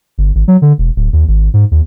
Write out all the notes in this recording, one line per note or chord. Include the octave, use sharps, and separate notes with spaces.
G1
G#1
F#3
D3
E1
D1
D#2
G#1
G#2
D#2